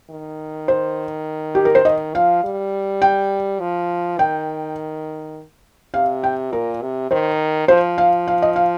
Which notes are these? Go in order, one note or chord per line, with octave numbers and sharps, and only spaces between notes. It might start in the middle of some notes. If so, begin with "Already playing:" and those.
D#3
C5
G4
A#4
C5
D#3 D#5
F3 F5
G3
G5
F3
D#3 G5
C3 F5
G5
A#2 A#4
C3
D#3 C5
F3 C5
F5
F5
D#5
F5